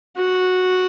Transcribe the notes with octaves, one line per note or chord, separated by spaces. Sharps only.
F#4